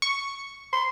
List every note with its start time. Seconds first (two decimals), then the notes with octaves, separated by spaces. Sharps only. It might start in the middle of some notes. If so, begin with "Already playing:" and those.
0.02 C#6
0.73 C6